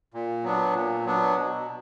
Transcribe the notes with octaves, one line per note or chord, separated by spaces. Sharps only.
A#2
F#3 B3 D4
A#2
F#3 B3 D4
B2